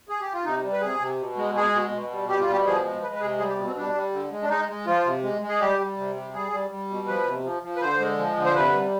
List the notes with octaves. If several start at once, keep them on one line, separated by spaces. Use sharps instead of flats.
G#4
G4
F4
C3 D#4
G3
B4
C3 G#4
C3
B2
G#3
G#3 G#4
B2
B2
G3
G3 G4
F4
B2 G4
F3 G#4
G#3
G#3 B4
B4
C3 G#4
G3 G#4
G4
B2 B3
C4
G3 D4
G3
D3
G#3
D4
G#3 D#4
G#3
F3 F4
C3
G#3
G#3
G#4
G3 G4
G3
C3
G3
G3 G#4
G3
G3
B2
F3 B4
C3
F3
F3
B4
D3 C5
G#3
F3
D3
C5
C3 B4
G3